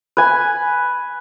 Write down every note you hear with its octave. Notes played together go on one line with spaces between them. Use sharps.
B4 G#5